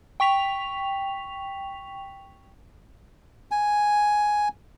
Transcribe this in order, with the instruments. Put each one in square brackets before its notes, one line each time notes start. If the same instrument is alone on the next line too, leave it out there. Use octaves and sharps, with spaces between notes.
[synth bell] G5 C#6 B6 F7
[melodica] G#5